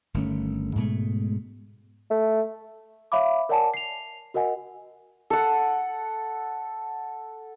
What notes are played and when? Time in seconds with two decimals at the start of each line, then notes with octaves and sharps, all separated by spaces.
0.14 G1 D#3 A3 C#4
0.76 G#2 B2 G#3 A3
2.11 A3
3.12 C#5 E5 F5 B5 D6
3.49 A#4 C#5 D5 F#5 G#5 A5
3.74 C7 F7
4.34 F#4 A#4 D#5 F#5 G#5
5.30 A4 F#5